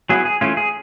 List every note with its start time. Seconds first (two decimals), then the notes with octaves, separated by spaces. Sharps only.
0.09 F#3 B3 E4 G#4
0.25 G#4
0.41 E3 A3 C#4 F4
0.57 G#4